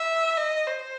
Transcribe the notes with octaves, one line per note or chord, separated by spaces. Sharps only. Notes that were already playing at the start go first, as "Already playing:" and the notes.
Already playing: E5
D#5
C5